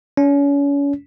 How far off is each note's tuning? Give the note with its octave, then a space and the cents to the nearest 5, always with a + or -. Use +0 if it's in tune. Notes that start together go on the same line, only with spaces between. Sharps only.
C#4 +35